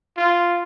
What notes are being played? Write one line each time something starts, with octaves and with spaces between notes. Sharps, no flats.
F4